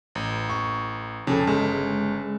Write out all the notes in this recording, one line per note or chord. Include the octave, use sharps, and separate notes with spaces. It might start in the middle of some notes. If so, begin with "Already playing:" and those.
A1
C#6
F2 C#3 G#4 A4
G1 G#3